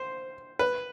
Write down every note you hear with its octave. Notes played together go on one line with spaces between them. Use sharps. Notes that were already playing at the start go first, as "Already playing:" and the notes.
Already playing: C5
B4